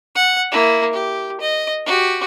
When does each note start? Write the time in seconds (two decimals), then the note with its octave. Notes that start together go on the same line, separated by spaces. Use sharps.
0.15 F#5
0.51 A#3 E4
0.93 G4
1.41 D#5
1.86 F#4 G4